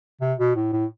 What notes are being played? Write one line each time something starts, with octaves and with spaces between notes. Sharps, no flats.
C3
B2
A2
A2